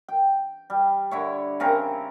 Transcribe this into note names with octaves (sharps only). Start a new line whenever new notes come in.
G5
G3
D3 E4 C#5
C#3 C4 A#4